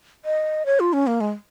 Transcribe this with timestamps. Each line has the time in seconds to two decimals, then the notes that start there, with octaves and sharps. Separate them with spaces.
0.25 D#5
0.66 C#5
0.80 F4
0.93 C#4
1.07 A#3
1.21 G#3